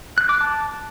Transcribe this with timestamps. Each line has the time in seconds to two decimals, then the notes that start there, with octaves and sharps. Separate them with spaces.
0.18 F#6
0.29 D6
0.41 A5